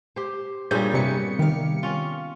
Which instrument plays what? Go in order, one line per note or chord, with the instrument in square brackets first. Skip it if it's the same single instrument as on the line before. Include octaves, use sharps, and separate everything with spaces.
[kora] G4 C5
[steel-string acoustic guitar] G2 C#4 G#4 [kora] A#2 G3 [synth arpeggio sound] G6
[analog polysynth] C3 G3 C#7 [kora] A#3 B3
[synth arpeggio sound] D#3 [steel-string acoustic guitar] G4 F5
[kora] C#4 F4